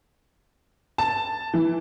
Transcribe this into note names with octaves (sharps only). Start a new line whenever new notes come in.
A5
E3